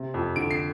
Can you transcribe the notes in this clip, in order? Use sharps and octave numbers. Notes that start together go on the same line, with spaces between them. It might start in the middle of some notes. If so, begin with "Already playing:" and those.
Already playing: C3
F2
D3 D7
C7